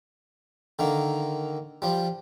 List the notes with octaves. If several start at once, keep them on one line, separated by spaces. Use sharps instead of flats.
D3 D#3 A#3
F3 G3